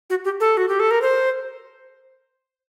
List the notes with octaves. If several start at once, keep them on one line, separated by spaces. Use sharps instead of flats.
F#4
G4
A4
F#4
G4
A4
A#4
C5